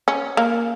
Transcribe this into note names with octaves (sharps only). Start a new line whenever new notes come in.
C#4
A#3